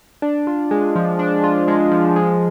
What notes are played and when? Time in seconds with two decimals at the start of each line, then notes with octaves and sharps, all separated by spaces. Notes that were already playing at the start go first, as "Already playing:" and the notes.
0.22 D4
0.47 F4
0.71 G#3
0.96 F3
1.19 D4
1.44 F4
1.68 G#3
1.92 F3
2.16 G#3